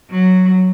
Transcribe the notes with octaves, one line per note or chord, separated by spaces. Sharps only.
F#3